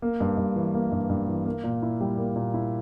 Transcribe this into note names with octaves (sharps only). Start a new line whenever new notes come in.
A#3
G2
G2
E3
A#3
G2
G2
E3
A#3
A#2
E4
G3
A#3
A#2
E4